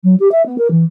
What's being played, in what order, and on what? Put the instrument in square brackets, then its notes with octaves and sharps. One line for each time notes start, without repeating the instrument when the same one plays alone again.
[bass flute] F#3
G4
E5
B3
A#4
E3